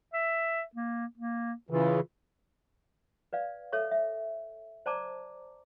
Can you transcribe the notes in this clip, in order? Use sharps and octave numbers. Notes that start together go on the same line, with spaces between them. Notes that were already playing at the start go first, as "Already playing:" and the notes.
E5
A#3
A#3
C#3 E3 F4
B4 D5 F5
A4 C#5 E5 C#6
E5
C5 D5 A5 A#5 D6